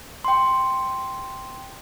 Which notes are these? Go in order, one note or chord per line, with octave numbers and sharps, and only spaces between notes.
G5 C6